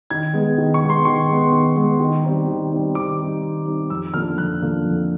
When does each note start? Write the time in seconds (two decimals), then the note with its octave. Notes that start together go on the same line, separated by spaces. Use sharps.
0.10 D#3 G#6
0.34 G#3 B3
0.58 D#3
0.74 C#6
0.82 G#3 B3
0.90 C6
1.05 D#3 C#6
1.29 G#3 B3
1.52 D#3
1.76 G#3 B3
2.00 D#3
2.25 G3 C4 D#4
2.47 D#3
2.72 G3 C4 D#4
2.95 D#3 D6
3.19 G3 C4 D#4
3.43 D#3
3.66 G3 C4 D#4
3.90 F2 E6
4.14 D3 F3 A#3 F6
4.38 F2 F#6
4.62 D3 F3 A#3
4.85 F2